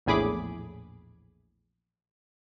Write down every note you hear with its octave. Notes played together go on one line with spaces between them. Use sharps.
A#1 E2 A2 G#4 B5 D6